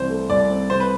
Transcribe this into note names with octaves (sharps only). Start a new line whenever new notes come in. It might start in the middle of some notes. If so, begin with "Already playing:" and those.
Already playing: C2 C3 E3 C5
A3
C2 D5
C4
C3 C5
B4